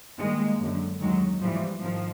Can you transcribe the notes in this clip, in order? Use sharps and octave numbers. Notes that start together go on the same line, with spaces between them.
G2 D#3 G#3 A#3
F#2 D3
D#2 D#3 F#3 G#3
G#2 E3 F3 G3
G#2 D#3 F3